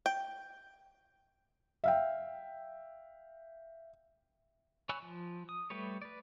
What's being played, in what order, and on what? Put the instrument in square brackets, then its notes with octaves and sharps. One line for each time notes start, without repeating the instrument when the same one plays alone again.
[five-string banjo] G5
[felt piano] E5 F5 G5
[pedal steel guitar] C#5 G#5 B5 E6 F#6
F3
D#6
G3 A3 G4 B4 C#5
B4 D5